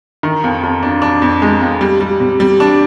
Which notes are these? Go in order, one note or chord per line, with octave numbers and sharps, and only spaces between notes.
D#3
F2
F2
D4
D4
F2
G#3
F2
G3
G3
C3
G3
D4